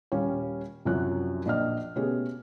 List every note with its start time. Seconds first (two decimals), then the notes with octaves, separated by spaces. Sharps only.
0.12 D#1 G3 C#4 C#5 F5
0.85 C2 F#2 F3 F#3 F4 F#6
1.45 A#1 A#3 D4 D5 D#5 F6
1.96 B2 A3 B3 C#4 G4 G#4